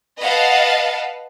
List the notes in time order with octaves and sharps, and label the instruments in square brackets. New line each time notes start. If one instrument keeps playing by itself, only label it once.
[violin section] B4 D#5 F5 F#5 A5